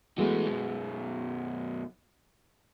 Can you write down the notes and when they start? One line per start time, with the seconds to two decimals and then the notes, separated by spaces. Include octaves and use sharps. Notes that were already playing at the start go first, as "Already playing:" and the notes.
0.18 E3 G#3 A3 B3 F#4
0.47 F#2 B2